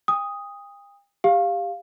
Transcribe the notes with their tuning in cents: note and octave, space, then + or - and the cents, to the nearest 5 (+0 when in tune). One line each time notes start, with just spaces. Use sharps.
G5 +45 D#6 +0
G4 +20 F5 +0